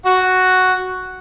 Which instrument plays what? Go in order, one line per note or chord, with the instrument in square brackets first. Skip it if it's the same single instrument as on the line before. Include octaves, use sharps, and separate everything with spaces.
[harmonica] F#4 F#5